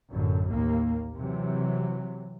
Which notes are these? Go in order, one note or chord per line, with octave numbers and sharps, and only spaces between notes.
A1 F#2 D3
A1 D#2 A#3
C3 E3 F#3